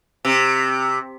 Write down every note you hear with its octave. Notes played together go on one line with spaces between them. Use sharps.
C3